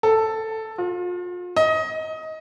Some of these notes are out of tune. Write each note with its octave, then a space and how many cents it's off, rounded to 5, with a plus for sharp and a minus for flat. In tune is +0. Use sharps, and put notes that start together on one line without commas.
A4 +5
F4 +35
D#5 +20